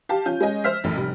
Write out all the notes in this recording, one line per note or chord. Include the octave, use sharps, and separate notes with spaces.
G4 F5 A5
C#4 F4 G6
G#3 C#4 D#5 G#5
C5 E5 F6 B6
A1 F#2 A2
F1 G3